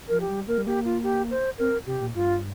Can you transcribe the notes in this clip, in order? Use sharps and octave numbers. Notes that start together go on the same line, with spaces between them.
F3 A#4
G4
G3
A#3 A#4
G3
A#3 G4
F4
G4
C5
C4 A#4
C3 G4
A#2
G2 F4